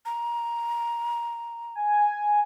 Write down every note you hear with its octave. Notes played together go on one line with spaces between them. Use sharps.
A#5
G#5